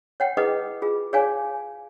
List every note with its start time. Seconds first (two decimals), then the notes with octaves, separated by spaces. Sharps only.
0.20 C#5 F#5 G5
0.37 E4 G#4 B4 D#5 F#5 D#6
0.82 F4 G#4
1.13 G#4 C#5 D5 F5 G#5